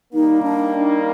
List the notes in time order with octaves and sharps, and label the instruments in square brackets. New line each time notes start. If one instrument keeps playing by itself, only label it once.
[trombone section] D#3 G3 A#3 [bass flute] D#4
[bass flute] D4